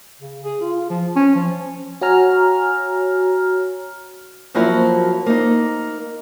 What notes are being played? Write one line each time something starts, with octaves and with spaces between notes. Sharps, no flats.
C#3
G#4
F4
F3
C#4
F3
F#4 C#5 G#5 A#5 F6
F3 F#3 A#3 C4 E4 F#4
A#3 D#4